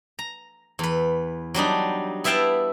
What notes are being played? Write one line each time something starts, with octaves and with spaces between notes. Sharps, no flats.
A#5
E2 B4
F#3 G3 D4 D#4
B3 E4 E5 F5 G5 A5